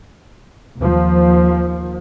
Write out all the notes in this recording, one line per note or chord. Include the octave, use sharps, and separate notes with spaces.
D#2 F3